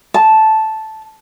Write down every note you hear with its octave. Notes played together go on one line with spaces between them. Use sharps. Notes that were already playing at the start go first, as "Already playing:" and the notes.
A5